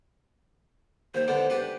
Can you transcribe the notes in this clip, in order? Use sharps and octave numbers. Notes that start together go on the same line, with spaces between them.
D#2 C5
D3 B3 D4
D4 G4 B4